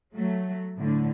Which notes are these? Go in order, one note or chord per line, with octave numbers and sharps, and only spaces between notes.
F#3 A3
A2 D3